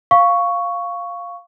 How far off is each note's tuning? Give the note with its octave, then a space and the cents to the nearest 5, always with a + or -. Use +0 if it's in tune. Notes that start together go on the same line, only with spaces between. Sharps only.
F5 +0 C#6 +5